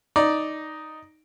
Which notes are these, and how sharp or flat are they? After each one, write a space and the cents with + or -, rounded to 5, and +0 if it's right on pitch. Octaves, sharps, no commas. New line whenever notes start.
D#4 +0 D5 +0